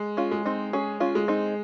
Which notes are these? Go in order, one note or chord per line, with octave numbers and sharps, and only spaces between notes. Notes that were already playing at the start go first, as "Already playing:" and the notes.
Already playing: G#3
C#4 F4
G#3
C4 D#4
C#4 G#4
C#4 F4
G#3
C4 D#4